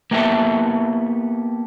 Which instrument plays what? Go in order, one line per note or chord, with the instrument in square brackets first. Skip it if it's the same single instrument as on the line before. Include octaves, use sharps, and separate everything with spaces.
[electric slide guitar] A#3 B3 E4 G4 A4 E5